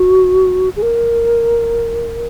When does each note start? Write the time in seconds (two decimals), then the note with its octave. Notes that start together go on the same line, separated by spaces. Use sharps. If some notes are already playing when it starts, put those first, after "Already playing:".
Already playing: F#4
0.76 G#4
0.82 A#4